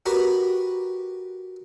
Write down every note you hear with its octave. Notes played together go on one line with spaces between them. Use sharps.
F#4 G4 A#4 B4 B5